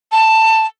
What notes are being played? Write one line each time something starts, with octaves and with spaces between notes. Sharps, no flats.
A5